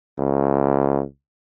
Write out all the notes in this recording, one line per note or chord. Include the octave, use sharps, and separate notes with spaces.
C#2